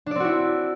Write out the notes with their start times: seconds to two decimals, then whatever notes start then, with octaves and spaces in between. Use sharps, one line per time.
0.06 D4
0.11 D5
0.15 C4
0.20 F#4
0.25 E4